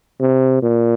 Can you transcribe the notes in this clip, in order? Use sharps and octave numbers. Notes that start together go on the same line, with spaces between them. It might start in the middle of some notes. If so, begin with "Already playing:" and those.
C3
A#2